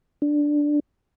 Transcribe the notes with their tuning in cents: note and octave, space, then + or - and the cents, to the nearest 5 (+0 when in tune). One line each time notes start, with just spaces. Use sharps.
D4 +0